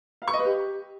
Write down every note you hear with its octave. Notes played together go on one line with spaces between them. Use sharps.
F5
C#6
D#5
B4
G4